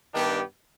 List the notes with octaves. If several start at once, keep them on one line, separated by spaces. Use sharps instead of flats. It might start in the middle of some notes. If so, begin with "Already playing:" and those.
G2 D#3 B3 D4 G4